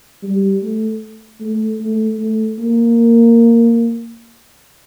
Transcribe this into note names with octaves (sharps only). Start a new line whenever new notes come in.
G3
A3
A3
A3
A3
A#3